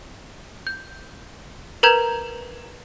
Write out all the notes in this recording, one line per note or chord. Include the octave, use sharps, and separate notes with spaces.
G6
A#4 B4 A#5 G6 G#6